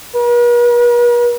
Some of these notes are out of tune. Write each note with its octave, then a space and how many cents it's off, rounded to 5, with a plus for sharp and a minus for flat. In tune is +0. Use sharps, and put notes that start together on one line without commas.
B4 -45